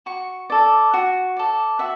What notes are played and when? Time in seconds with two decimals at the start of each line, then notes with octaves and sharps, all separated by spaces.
0.06 F#4 C#6
0.50 A4 D5
0.94 F#4
1.37 A4 D5
1.79 F#4 E5